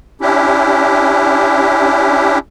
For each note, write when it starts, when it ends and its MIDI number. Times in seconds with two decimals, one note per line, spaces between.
0.21 2.38 61
0.21 2.38 62
0.21 2.38 64
0.21 2.38 67